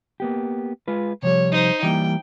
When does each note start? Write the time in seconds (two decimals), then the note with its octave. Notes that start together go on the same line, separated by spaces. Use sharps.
0.20 A#3 B3 G4
0.88 G#3 F4 B4
1.23 C3 F3 G3 C#5
1.52 D#4 C5
1.83 E3 G3 A#3 G5